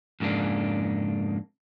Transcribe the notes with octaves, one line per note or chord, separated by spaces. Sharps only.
F2 G#2 C#3 A#3 D4